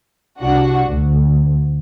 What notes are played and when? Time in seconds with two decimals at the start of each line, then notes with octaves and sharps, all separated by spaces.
0.40 C2 D4 F#4 F#5
0.88 D2